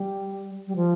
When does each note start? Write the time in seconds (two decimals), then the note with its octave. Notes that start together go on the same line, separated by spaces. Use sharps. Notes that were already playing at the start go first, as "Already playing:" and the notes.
Already playing: G3
0.67 G3
0.76 F3